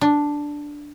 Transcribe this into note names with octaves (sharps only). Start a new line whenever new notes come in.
D4